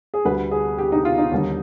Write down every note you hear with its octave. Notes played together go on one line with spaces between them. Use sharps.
G#4
D2 D3 G3 B4
G#4
G4
D#4
F4
D#4
D#2 D3 G3